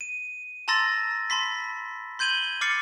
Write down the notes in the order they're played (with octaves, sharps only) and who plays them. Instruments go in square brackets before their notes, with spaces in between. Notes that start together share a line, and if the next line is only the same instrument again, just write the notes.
[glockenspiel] D#7
A5 A#5 C6 E6 A6 A#6
A5 B5 C6 B6
C6 G6 G#6 D#7 F#7 G7
D6 F6 A6 C7 C#7